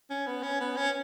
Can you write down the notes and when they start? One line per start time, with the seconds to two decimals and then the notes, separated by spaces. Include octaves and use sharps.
0.10 C#4
0.27 B3
0.43 C#4
0.60 B3
0.77 C#4